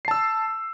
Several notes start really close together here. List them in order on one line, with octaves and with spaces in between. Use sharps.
C7 A5 E6